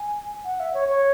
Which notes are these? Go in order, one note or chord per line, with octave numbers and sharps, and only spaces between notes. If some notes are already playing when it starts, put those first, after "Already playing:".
Already playing: G#5
F#5
E5
C#5
C#5